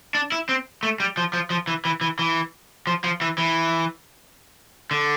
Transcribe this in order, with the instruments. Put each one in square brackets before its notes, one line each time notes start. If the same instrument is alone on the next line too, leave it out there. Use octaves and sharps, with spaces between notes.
[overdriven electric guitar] D4
E4
C4
A3
G3
F3
F3
F3
E3
E3
E3
E3
F3
F3
E3
E3
D3